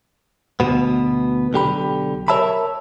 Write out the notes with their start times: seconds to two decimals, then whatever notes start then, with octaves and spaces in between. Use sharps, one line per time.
0.60 D2 B2 B3
1.53 B1 D3 G4 B5
2.28 A#4 C5 C#5 E5 A5 B5